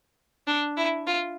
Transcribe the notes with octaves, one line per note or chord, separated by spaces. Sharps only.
D4
E4
F4